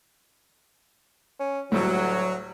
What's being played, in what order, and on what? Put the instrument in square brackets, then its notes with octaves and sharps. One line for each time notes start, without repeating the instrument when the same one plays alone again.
[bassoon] C#4
[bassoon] D2 [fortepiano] A2 G3 [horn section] F#3